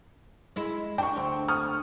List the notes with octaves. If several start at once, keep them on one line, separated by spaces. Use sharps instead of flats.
G#3 E4
D4 G5 C#6
D2 C4
C#6 D#6 F6